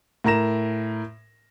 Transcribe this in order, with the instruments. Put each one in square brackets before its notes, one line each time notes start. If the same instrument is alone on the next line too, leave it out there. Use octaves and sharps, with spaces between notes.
[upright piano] A2 A#4 A#5 A#6 E7